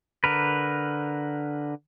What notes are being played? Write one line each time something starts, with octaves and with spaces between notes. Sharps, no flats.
D3 A#4 B4